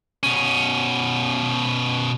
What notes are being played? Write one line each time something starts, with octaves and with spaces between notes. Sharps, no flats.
B2 C#4